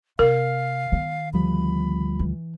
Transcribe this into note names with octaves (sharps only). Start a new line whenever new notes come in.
C3 A#4 F5
D#3 B3
D2 F3 G3 B5
E3